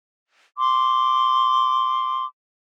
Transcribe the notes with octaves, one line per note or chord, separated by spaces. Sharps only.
C6 D6